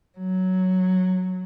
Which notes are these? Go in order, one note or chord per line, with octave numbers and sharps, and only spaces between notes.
F#3